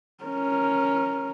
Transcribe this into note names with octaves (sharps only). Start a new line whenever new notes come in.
C#4 A#4